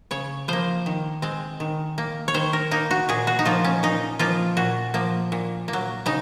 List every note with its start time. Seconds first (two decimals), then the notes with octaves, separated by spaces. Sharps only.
0.11 C#3 C#5
0.48 F3 A#3 C5
0.86 D#3
1.22 G#3 C4
1.60 D#3
1.98 A#3
2.28 C#5
2.34 D#3 C5
2.53 A#4
2.71 A#3 D#4
2.91 F#4
3.09 A#2 G#4
3.27 F#4
3.39 D#4
3.45 F3 A#3 F4
3.64 C#4
3.83 A#2 D#4
4.19 F3 A#3 F4
4.57 A#2 F#4
4.94 F3 A#3
5.32 A#2
5.68 A#3
5.73 F#3
6.06 C#3 D#4